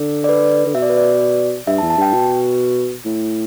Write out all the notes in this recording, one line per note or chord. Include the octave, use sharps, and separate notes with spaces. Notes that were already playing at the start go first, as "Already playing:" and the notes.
Already playing: D3
D5
B4
D3
B2 E5
D5
B4
D5
G2 E5
A5
E2
A5
G2 G5
B2
A2